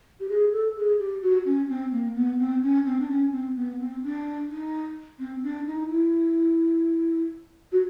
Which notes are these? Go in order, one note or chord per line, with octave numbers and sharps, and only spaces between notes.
G4
G#4
A4
G#4
G4
F#4
C#4
C4
A#3
B3
C4
C#4
C4
D4
C#4
C4
B3
C4
D4
D#4
C4
D4
D#4
E4
F#4